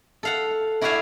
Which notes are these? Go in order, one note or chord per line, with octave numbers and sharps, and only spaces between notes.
A4 F5 F#5
E4 F#4 D5 E5 F5 G#5